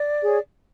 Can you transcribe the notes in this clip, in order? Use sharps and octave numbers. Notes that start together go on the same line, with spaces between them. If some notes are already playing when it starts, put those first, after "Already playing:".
Already playing: D5
G#4 C#5